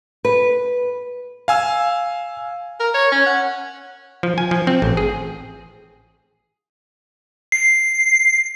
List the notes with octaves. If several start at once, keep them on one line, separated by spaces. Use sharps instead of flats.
B4
F5 G#5 E6
A#4
C#5
C#4
F#5
F3
G#5
F3
C4
A1
G#4
C7